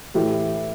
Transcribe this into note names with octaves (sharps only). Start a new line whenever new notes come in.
A2 E3 A3 E4 G4